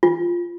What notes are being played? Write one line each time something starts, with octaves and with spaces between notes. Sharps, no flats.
F4